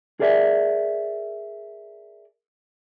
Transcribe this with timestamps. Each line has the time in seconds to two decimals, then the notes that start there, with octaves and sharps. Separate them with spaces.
0.20 G#4 A#4 D5 E5